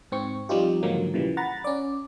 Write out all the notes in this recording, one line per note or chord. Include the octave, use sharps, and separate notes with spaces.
G#2 C4 C#6
F3 G3 C4 D#4 F4 G4
G#2 D3 D#3 F3 F#3 A#3
A#2 C#3 E3 F3 G3
F#5 A#5 B5 A6
C#4 D5